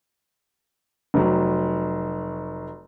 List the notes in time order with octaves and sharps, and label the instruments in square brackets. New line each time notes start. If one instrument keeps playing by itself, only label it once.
[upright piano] F1 F#3